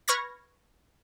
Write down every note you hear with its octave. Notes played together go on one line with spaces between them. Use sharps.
B4 B5 C#6 F6 G#6 A#6